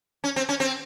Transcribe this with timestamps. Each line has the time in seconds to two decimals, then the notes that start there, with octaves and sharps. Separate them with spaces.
0.24 C#4
0.36 C4
0.49 C#4
0.60 C4